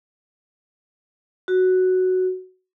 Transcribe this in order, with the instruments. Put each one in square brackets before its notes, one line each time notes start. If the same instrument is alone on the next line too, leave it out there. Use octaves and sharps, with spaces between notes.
[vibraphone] F#4